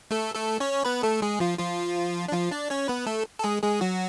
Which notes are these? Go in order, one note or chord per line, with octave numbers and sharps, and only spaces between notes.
A3 A4
A3 A4
C#4 C#5
B3 B4
A3 A4
G#3 G#4
F3 F4
F3 F4
D4
F3 F4
D4 D5
C#4 C#5
B3 B4
A3 A4
A4
G#3 G#4
G#3 G#4
F#3 F#4